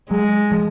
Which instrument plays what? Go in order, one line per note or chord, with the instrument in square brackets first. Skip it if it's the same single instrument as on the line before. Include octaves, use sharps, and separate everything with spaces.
[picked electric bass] F#3 [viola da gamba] G#3
[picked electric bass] F3